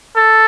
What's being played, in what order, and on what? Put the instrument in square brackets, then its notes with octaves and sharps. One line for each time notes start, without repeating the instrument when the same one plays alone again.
[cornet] A4